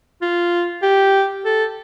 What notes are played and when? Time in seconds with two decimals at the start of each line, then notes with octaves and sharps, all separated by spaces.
0.22 F4
0.83 G4
1.45 A4